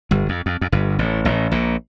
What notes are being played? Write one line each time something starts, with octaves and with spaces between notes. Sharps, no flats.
G1 G2
F2
F2
F2
G1 G2
A1 A2
A1 A2
A#1 A#2